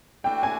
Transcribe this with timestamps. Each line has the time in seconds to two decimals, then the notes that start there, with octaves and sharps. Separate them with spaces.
0.24 E3 A3 D4 F#4 G5
0.43 G#5